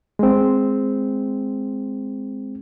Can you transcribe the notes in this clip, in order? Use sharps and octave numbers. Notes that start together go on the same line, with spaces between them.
G#3 C4